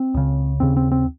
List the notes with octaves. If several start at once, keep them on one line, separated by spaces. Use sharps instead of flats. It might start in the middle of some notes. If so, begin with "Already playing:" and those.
Already playing: C4
C#2 C#3
D#2 C#3 C4
C4
C4